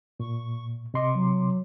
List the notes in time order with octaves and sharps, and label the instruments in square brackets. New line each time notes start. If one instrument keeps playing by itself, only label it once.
[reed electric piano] A#2 [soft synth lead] C#6
[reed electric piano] C3 C6 D6 [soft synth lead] D#5
[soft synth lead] F#3